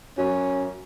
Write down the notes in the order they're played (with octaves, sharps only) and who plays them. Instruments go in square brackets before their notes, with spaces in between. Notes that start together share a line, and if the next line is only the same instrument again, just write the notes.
[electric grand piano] F#2 F#4 [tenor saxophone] C#4